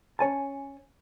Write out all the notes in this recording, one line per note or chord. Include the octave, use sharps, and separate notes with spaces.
C#4 C#5 G#5 A5